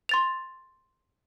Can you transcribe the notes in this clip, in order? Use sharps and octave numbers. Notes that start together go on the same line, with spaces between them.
C6 A6 F7